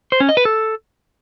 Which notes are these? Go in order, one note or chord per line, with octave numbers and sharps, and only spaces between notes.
C5
C#4
D#5
B4
A4